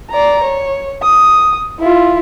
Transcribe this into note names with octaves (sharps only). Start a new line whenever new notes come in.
D5 A#5
C#5
D#6
E4 F4